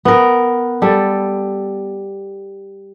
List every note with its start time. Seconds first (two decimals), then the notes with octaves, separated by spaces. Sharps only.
0.05 B3 A#4
0.82 G3 A4